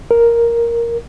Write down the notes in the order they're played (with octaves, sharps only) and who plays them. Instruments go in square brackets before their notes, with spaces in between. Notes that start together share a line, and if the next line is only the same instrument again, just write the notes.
[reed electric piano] A#4